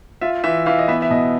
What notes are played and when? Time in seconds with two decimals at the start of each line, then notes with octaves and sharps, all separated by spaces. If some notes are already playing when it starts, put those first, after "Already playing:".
0.21 F4 E5
0.44 E3 E5
0.66 E3 F5
0.79 D#5
0.88 B3 E5
1.02 E5
1.10 B2 D#5